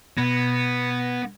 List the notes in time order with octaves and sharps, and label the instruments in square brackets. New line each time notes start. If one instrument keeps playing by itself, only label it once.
[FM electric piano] B2 G#6 A#6 [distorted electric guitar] B3